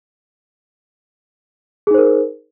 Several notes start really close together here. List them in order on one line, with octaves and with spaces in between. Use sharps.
G#4 D#4 C5 A#4